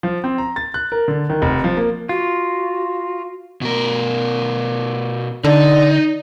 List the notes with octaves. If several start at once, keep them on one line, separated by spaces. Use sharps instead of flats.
F3
C4
A#5
A6
F#6
A#4
D3
D#3
F1
F3
A#3
F4 F#4
B2 A#4
D3 D#4 D5